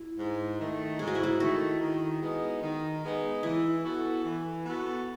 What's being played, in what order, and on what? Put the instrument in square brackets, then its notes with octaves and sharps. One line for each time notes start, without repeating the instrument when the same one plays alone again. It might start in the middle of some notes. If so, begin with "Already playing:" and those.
Already playing: [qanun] E4
[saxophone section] G#2
D#3 A3
[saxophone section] G#2 [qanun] G#4
[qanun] F#4
E4
F#4
[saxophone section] D#3 A3 [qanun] F#4
[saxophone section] D#3
G#3 B3 D#4
D#3
G#3 B3 D#4
[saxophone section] E3 [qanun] E4
[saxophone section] B3 F#4 A4
E3
B3 F#4 A4